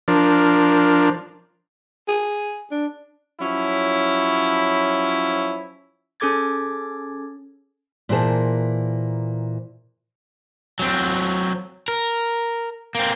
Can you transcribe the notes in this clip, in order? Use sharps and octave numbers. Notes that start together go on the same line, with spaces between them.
F3 D4 A#4
G#4
D4
F3 F#3 C#4 E4
C#4 G#4 A4 D6 G#6 A6
A#2 E3 A#3 G#4 C5 A5
F#3 C4
A#4
A#3 C4